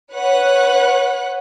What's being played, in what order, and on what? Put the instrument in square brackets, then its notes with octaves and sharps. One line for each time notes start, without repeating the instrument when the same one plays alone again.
[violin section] B4 C#5 F#5 F#6